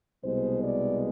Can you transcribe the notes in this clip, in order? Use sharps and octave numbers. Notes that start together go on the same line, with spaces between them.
C2 B2 G#3 B3 C5
D5